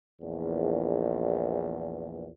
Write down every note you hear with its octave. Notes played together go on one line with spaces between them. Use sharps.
A#1 E2